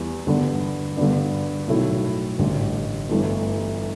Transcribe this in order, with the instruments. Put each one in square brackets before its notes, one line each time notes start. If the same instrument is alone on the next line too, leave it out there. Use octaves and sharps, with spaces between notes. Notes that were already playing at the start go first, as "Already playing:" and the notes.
Already playing: [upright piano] E2 E3 G3 E4
G2 D3 B3 D4
G2 D3 B3 D4
B1 A2 A3 E4
A1 G2 D3
G1 G2 E3 A3